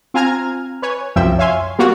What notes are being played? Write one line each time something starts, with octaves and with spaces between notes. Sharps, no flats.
C4 F4 G#5 A#5 F6 G#6
B4 C#5 G#5
C2 F#2 F3 E5 G5 E6
C#5 E5 F5 G#5 C6
G3 A#3 B3 F4 F#4